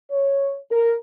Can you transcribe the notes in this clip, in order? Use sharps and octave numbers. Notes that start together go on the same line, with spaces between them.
C#5
A#4